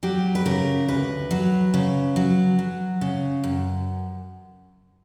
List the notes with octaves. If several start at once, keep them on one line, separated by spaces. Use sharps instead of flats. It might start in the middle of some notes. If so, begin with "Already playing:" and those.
F#3 G4
B4
C#3 A#4
D2 B4
F#3
C#3
F#3
F#3
C#3
F#2